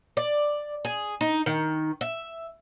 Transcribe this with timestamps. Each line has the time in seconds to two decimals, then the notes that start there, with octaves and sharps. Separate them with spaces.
0.17 D5
0.85 G#4
1.21 D#4
1.46 D#3
2.01 E5